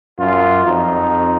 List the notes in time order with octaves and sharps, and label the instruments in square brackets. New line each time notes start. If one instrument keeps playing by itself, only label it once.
[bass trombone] F#2 [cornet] F4
[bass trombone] F2 [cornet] D#4